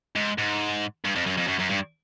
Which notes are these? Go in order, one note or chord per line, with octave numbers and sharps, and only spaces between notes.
G#2
G#2
G2
F2
F#2
F2
F#2
F#2
G2